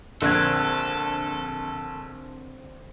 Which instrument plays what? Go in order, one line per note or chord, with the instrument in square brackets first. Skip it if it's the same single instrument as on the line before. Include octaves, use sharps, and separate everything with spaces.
[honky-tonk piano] A#1 [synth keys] D3 C4 [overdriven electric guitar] A4 [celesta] A#4 F#6 G#6